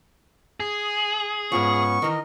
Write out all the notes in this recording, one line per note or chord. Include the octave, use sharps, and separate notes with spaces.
G#4 D#6
G#2 F3 B3 C#4 C#6
D#3 E3 A#4 D#5